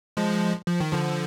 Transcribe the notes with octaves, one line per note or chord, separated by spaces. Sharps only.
F3 G#3
F3
D#3
D3 F3